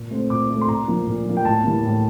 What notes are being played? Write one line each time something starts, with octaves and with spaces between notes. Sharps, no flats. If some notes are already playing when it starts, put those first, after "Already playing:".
Already playing: A#2
A3 C4
A#2 D6
A3 C4
C6
A#2 A#5
F3 A#3
A#2
F3 A#3
G5
A2 A5
E3 G3 A#3
A2